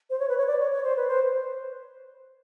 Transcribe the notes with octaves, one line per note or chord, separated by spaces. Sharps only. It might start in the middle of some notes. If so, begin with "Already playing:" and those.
C5
C#5
B4
C#5
D5
C#5
C#5
C5
B4
C5